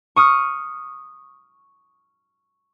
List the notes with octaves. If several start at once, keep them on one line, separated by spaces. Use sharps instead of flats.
C#6 D#6 F6